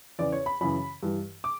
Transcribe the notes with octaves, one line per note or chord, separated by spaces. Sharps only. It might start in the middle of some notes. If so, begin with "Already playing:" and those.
E2 C#3 E3 D5
C#5
B5
F#2 C#3 E3 B5
G2 E3
D6